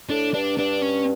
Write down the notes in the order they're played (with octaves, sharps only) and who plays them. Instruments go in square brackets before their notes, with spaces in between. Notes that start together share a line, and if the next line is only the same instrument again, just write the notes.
[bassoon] A2 [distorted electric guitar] D4
[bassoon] G2 [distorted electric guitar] D4
[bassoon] G2 [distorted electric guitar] D4
[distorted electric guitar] C#4